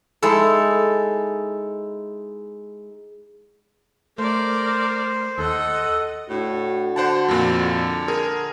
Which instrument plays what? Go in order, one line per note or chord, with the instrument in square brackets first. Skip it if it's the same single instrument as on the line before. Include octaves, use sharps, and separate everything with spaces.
[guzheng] G#3 D#4 E4 A4
[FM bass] A3 [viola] A#4 D5 [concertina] C5
[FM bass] D#2 [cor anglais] A4 [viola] D#5 F#5
[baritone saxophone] A2 [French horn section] D4 F#4
[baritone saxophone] D3 [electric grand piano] C5 F#5 A5
[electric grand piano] F2 A#2
G#4 A#4